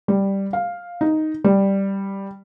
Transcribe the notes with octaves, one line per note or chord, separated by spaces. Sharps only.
G3
F5
D#4
G3